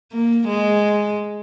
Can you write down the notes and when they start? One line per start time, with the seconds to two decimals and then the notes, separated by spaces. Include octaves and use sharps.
0.12 A#3
0.48 G#3